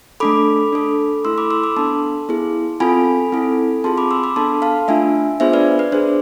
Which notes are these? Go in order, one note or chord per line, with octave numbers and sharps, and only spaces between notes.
A3 D4 A4 B5 D6
D4 A4
A3 E4 A4 C6 E6
B5 D6
C6 E6
B5 D6
B3 D4 A4 A5 C6
B3 E4 G#4
C4 F4 A4 G#5 B5
C4 E4 A4
C4 F4 G#4 A5 C6
B5 D6
C6 E6
B5 D6
B3 D4 A4 A5 C6
F5 A5
A3 D4 F4 E5 G#5
B3 D4 F4 G#4 C5 E5
B4 D5
B4
D4 G#4 C5